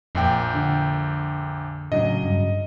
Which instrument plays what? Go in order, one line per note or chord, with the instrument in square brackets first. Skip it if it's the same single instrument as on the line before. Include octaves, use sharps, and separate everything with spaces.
[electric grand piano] A#1 A#2 G5 [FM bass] F2
[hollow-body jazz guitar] D3
[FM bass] A2 [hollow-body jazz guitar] C#3 F#3 D4 [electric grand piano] D#5
[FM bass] G2